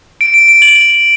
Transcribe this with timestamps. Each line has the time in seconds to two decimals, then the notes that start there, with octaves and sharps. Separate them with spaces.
0.21 D7
0.34 D7
0.48 D7
0.62 F#7
0.75 F#7